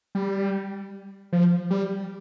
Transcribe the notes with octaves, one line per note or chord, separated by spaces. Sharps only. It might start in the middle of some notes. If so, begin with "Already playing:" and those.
G3
F3
G3